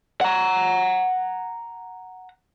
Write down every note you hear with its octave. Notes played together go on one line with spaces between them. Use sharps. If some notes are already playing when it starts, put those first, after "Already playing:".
F#5 A#5